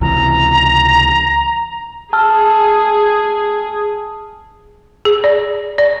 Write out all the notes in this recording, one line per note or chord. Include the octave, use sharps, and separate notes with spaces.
C#2 C3 E3 A#5
G#4 A5 E6 F6
G#4
D5
D5